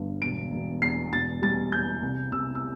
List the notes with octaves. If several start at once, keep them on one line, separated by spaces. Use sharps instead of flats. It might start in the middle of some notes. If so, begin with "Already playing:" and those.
Already playing: G1 G2
E1 D7
E1
E2 C7
E1 A6
G3 A6
E2 G6
C2
C2 E6
E6